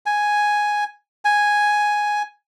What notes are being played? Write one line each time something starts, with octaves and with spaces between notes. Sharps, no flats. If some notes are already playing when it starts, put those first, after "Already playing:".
G#5
G#5